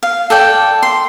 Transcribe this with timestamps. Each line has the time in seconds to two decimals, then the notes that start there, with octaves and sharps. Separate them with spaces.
0.03 F5
0.30 A4 D5 G5
0.83 C6